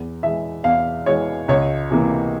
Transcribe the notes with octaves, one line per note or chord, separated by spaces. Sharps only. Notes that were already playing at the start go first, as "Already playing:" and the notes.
Already playing: E2
E3 G#3 E5
E2 F5
E3 G#3 C#5
C#2 C#5
C3 E3 A#3